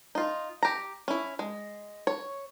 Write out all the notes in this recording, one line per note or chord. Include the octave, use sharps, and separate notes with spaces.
D#4 F4
G4 A#5
C#4 E4
G#3
C#5